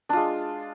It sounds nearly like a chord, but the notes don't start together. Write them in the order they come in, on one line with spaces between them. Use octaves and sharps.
D4 F4 G#3